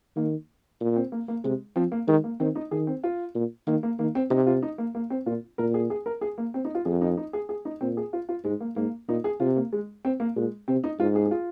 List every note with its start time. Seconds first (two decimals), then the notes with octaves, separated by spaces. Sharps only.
0.16 D#3 A#3
0.80 A#2
0.96 C4
1.12 A#3
1.28 A#3
1.44 C3 G#3
1.76 F3 C4
1.92 A#3
2.07 D#3 G#3
2.24 A#3
2.40 D#3 C4
2.55 D#4
2.71 D#3 G#4
2.87 C4
3.04 F4
3.35 A#2
3.67 D#3 A#3
3.83 A#3
3.99 D#3 A#3
4.15 C4
4.30 C3 D#4
4.47 F4
4.62 D#4
4.78 A#3
4.95 A#3
5.10 C4
5.26 A#2 F4
5.58 A#2 A#4
5.74 G#4
5.90 G#4
6.06 A#4
6.21 G#4
6.38 A#3
6.54 C4
6.65 D#4
6.75 F4
6.85 F2 G#4
7.01 D#4
7.17 D#4
7.33 G#4
7.49 G#4
7.65 D#4
7.81 A#2 C4
7.97 G#4
8.13 F4
8.29 F4
8.44 G#2 G#3
8.60 A#3
8.76 G#2 A#3
9.08 A#2 D#4
9.24 G#4
9.40 C3 F4
9.56 A#3
9.73 G#3
10.05 C4
10.20 A#3
10.36 A#2 G#3
10.68 C3 C4
10.84 D#4
10.99 G#2 F4
11.15 G#4
11.26 G#4
11.31 F4